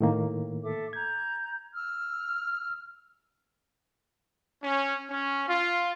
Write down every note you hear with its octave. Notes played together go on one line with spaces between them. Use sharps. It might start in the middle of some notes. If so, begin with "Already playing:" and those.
A2 D#3 A#3
A4 E5 D6
A#5 G6 G#6
E6 F6
C#4
C#4
F4